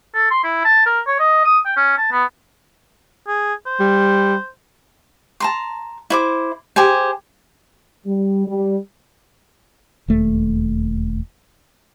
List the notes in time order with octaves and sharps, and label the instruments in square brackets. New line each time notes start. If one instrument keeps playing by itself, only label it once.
[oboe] A4
C6
E4
A5
A#4
C#5
D#5
D#6
G5
C#4
A5
B3
G#4
C5
[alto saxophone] G3
[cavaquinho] A5 A#5 C6
E4 C5 D6
G4 G#4 C5 G#5
[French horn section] G3
G3
[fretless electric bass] E1 D#2 A3